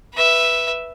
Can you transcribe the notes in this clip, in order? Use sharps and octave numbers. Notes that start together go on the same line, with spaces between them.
B4 E5